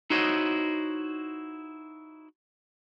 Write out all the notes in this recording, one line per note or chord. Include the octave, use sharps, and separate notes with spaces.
D#4 E4 F#4 C5 C#5 D#5